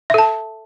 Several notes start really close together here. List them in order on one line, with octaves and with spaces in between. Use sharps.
E5 A4 A5